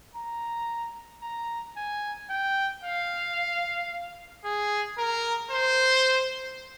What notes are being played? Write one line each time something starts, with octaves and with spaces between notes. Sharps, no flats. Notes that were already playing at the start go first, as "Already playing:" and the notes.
A#5
A#5
G#5
G5
F5
G#4
A#4
C5